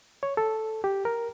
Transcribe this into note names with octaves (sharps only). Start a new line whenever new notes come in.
C#5
A4
G4
A#4